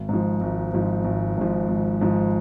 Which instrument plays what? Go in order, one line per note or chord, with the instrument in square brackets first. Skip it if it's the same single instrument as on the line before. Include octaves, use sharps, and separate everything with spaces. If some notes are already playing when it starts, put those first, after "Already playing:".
Already playing: [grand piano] G#1
G#2 F3
G#1
G#2 F3
G#1
G#2 F3
G#1
G#2 F3